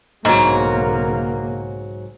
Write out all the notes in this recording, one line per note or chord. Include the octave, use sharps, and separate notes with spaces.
B1 G#2 C#3 F#3 A#3